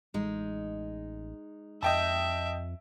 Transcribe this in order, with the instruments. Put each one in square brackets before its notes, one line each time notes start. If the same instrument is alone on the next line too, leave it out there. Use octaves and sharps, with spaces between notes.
[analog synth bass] A1 [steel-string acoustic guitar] G#3 D#4
[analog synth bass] F2 [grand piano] D#5 G5 A5 [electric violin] E5